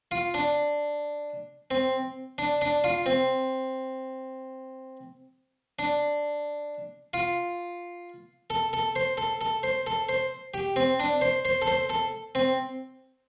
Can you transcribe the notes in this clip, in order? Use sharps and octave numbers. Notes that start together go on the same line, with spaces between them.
F4
D4
C4
D4
D4
F4
C4
D4
F4
A4
A4
C5
A4
A4
C5
A4
C5
G4
C4
D4
C5
C5
A4
C5
A4
C4